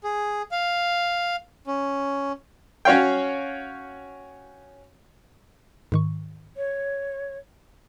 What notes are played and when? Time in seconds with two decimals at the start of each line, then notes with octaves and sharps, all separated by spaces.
0.04 G#4
0.52 F5
1.67 C#4
2.85 C#4 F#4 C#5 F5 G5
5.92 G#2 D#3 C#6
6.57 C#5